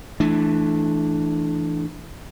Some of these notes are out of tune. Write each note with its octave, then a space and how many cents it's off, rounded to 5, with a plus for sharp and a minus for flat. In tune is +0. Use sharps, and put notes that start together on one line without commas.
E3 +0 A3 -20 D4 +10